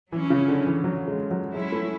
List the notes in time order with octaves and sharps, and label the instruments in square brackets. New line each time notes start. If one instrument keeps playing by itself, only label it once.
[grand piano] E3 [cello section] F#3 C#4 E4
[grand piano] C#3
D3
E3
F#3
G#3
F#3
[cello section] F#3 C#4 E4 [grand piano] G#3
[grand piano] A3